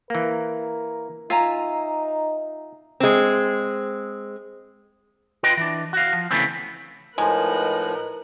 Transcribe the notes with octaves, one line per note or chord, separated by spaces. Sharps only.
E3 A#3 A#4
D#4 F4 E5 G#5 A#5
G#3 C4
F4 B4 D#5 G5 C6
E3 D4
F#4 F5
F3
C#3 E3 A3 B3 C4
A2 F3 G#3 D#4 A#4 B4 F#6